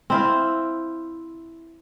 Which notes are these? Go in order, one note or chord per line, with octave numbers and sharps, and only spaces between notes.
C4 E4 F5